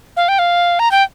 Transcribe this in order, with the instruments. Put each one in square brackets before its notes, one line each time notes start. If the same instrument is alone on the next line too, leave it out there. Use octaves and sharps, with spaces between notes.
[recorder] F5
G5
F5
A#5
G5